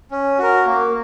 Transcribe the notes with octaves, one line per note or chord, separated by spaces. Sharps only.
C#4
F#4 A#4
A#3